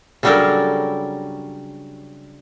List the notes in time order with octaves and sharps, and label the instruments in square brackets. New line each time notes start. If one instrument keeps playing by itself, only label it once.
[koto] C#3 F#3 G3 D4 A4 A#4